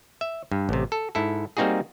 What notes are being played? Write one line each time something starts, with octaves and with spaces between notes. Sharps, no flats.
E5
G2
A1 C3
A4
G#2 E4 A4
G3 A#3 C4 D#4 F#4 G#4